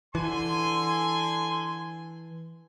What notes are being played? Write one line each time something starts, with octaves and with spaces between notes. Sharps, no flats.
D3 E3 G#5 C6